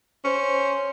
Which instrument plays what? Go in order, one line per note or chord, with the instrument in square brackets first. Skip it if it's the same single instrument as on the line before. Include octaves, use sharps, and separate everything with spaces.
[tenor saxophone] C#4 [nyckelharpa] C5